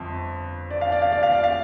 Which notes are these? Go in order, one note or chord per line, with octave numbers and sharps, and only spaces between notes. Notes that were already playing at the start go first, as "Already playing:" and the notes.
Already playing: G1 F2 C4
D5
F5
D5
F5
D5
F5
D5
F5